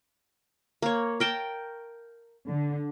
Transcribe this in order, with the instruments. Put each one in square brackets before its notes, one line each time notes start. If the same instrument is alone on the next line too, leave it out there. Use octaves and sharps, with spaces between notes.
[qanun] A#3 C#5
A#4 G5 A5
[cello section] D3